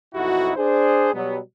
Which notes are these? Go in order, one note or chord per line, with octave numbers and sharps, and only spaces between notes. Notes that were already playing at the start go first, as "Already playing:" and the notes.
B1 F2 D#4 E4 F#4
D4 G#4 C5
B2 F#3 G3 B3